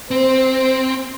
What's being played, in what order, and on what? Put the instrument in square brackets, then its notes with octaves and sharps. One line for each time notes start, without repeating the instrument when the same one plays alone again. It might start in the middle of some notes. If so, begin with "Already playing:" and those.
[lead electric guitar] C4 [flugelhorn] C5